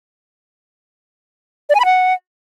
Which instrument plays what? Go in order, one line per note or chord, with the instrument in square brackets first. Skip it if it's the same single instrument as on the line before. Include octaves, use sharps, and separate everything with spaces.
[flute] D5
G#5
B5
F#5